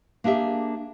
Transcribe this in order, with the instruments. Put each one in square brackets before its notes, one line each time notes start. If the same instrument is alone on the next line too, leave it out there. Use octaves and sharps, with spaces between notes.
[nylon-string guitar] A#3 D4 G4 G#4 E5